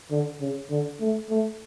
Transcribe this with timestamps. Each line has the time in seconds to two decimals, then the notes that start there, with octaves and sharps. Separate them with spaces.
0.11 D3
0.40 C#3
0.70 D3
1.00 A3
1.30 A3